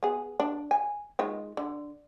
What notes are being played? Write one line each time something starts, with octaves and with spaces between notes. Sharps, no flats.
B3 G#4
D4
G#5
D#3 G#3 F4
D3